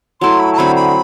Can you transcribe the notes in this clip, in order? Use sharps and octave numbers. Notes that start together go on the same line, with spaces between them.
F#3 A3 E4 C6
B5
A5
D3 F#3 C4 B5
B5